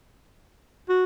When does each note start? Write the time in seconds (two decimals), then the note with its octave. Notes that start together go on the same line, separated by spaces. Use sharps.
0.89 F#4